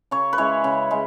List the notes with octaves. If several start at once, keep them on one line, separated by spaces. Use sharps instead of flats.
C#3 C#5
B4
G#3 C#4 E4 C#5
C#3
G#3